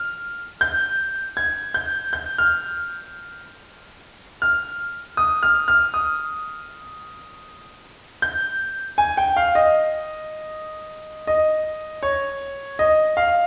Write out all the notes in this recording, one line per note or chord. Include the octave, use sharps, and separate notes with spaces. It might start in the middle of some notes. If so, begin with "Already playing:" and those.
Already playing: F6
G6
G#6
G6
G6
F6
F6
D#6
F6
F6
D#6
G6
G#5
G5
F5
D#5
D#5
C#5
D#5
F5